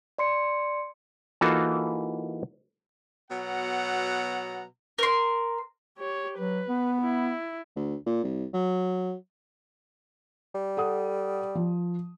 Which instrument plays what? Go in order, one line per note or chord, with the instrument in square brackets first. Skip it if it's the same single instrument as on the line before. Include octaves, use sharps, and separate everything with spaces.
[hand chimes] D5 C6 C#7
[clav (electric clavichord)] E3 A#3 D#4 F4 F#4 A4
[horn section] B2 F#3 B3 F#5 A#5
[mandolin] A#4 C6
[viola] G4 C#5
[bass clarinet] F#3 [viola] B4
[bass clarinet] B3
[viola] E4
[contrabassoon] D2
A#2
C2
F#3
[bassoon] G3
[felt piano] A4 F#5 D#6
F3